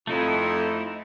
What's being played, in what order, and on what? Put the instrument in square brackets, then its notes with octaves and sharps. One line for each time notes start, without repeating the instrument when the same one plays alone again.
[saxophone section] F2 [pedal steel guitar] A3 D#4 E4